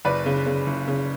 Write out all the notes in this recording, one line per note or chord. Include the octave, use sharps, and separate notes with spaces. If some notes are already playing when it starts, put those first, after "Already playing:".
F#1 B4 D5
C#3
C#3
F#1
C#3